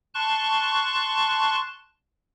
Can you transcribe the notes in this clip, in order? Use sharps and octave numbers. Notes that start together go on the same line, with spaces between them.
A5 C6 C#6 F#6